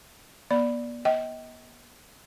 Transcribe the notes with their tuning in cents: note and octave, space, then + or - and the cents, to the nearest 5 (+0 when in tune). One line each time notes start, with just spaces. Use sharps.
B3 -40 D5 +0 B5 +0
D#5 +35 G5 -25